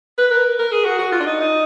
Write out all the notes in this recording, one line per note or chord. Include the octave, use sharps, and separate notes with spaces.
B4
A#4
A#4
G#4
F#4
F#4
F4
D4
D#4
D#4